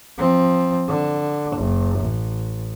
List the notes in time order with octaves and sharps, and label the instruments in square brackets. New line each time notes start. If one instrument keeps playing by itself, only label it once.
[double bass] F3 C4
D3
F#1
A1